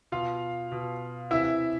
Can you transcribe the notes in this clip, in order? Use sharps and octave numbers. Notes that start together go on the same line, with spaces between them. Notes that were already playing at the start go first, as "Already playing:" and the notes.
B2 F4 F5
B2
C3 E3 E4 E5